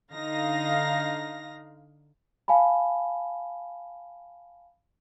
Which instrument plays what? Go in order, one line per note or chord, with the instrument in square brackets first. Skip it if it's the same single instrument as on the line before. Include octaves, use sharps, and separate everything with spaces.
[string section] D3 D#4 F5 A#6
[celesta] F5 G#5 A5 B5